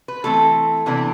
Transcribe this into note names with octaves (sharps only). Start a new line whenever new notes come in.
B4
E3 A3 C4 A4
C3 E3 B3 D4